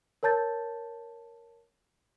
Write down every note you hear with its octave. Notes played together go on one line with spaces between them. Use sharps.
A#4 C#5 A5 G6 A6